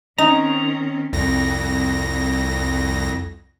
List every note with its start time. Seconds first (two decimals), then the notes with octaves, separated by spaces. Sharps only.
0.18 D#3 C4 C#4 D#4 A#5
1.13 C2 F2 A#6